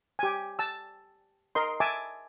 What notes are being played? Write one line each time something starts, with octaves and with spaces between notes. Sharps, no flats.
G4 G#5
A5 E6
A#4 D#5 C6
E5 G#5 A5 D6